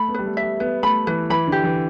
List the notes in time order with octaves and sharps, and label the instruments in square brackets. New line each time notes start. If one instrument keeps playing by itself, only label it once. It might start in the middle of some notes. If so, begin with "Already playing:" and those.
Already playing: [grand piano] A3 [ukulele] B5
[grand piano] B3
[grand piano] G3 [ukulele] B4
[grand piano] A3
[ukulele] E5
[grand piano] G3
[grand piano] B3 [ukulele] B4
[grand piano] A3 [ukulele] B5
[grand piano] E3 [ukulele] B4
[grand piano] E3 [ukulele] B5
[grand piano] D3 [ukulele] G4
[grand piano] E3